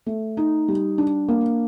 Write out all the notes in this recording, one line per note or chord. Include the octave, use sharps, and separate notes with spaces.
A3
D#4
G3
D4
A#3